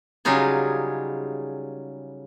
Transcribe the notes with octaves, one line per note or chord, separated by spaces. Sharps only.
C#3 F#3 G3 D#4 F4 G#4